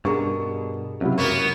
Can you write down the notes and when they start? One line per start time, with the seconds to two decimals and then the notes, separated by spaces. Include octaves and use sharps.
0.05 G2 B2 D4 G#4 A#4 C#6
1.01 C#2 C3 F#3 E4
1.18 F#2 A#3 B3 A#4 C#6